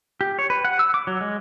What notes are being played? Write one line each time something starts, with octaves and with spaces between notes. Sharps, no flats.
G4
C#5
B4
F#5
E6
D6
F#3
G#3